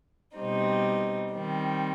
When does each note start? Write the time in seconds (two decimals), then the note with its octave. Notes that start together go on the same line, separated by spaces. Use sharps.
0.38 B2 G3 C4 D#4
1.34 D#3 G3 C4